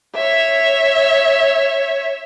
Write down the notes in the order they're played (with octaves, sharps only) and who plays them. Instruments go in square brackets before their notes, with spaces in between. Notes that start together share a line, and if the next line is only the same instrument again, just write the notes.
[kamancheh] C#5 E5